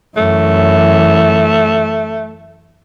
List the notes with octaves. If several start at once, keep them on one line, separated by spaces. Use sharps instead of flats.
F#2 E3 A3